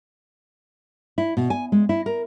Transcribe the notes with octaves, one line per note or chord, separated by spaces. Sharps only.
E4
B2
G#5
G#3
E4
A#4